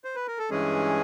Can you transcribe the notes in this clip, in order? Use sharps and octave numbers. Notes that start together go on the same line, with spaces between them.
C5
B4
A#4
A4
G2 E3 G#3 C#4 G#4